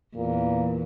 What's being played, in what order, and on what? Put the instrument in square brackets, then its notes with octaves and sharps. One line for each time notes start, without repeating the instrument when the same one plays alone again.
[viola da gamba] E2 [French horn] A#2